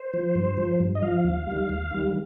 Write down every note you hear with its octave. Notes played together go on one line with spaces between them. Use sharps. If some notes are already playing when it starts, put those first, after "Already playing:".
Already playing: C5
F3
G2
F3
G2
D#5
F3 F5
D#2
D#3 G3
D#2
D#3 G3